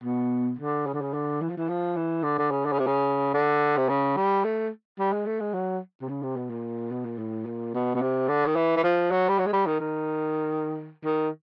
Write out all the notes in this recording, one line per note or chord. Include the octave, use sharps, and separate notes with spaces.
B2
D3
C#3
D3
C#3
D3
E3
F3
E3
F3
E3
D3
D3
C#3
D3
C#3
C3
C#3
D3
C3
C#3
G3
A3
G3
G#3
A3
G#3
F#3
C3
C#3
C3
B2
A#2
B2
A#2
A2
A#2
B2
B2
C3
D3
D#3
E3
E3
F3
F#3
G3
F#3
G#3
G3
D#3
D#3
D#3